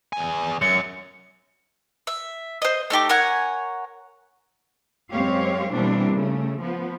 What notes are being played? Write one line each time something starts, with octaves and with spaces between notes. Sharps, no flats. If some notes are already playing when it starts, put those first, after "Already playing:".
E2 G#5
F#2 C#7
E5
C5 D#5
A3 D#4 G4 D6
A#4 C#5 F#5 G#5
F#2 G#3 C4 G4 C#5 F5
B2 E3 G3 A#3 C4 D4
C#3 A3
F3 B3